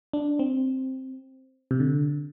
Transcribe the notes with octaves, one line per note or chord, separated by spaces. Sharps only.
D4
C4
C3
D3